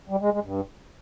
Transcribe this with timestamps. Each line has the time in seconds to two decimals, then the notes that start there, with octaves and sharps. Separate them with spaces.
0.09 G3
0.21 G#3
0.32 G#3
0.44 G2